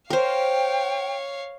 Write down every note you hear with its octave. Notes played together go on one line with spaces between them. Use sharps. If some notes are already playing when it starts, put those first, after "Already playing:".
A#4 C5 C#5 F5 G5